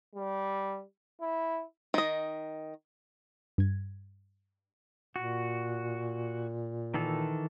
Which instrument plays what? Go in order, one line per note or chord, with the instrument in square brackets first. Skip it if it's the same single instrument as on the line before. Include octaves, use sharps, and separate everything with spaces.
[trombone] G3
E4
[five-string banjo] D#3 D#5
[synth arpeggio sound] G2 G#6
[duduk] A#2 [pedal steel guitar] F#4
[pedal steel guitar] D#3 E3 A4